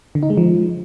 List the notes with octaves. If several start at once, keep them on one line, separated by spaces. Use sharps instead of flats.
D3
D#4
G#3
F3